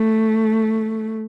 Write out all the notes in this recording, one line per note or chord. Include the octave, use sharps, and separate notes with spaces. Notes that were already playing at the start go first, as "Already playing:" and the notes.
Already playing: A3